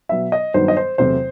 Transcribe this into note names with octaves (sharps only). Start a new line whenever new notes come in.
B2 F#3 B3 E5
D#5
G2 D#3 F#3 B3 C5
D#5
C5
E2 C3 F#3 A3 C5